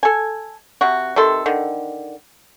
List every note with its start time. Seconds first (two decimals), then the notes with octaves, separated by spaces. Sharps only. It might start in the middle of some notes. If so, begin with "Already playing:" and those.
0.03 A4 G#5
0.81 C3 F#4
1.16 C3 D#3 A4 C6
1.46 D3 D#3